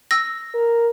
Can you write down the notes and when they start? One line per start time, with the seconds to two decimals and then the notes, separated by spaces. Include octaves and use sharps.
0.11 E6 A#6
0.54 A#4